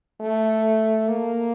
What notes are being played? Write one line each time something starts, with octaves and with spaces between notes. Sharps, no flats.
A3
A#3